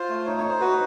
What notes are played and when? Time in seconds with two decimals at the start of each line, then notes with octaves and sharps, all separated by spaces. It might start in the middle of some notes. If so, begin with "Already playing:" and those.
Already playing: F4 C5
0.09 A3
0.26 D#4 C#5
0.38 C#5
0.44 D#4
0.49 C5
0.60 F#4 B4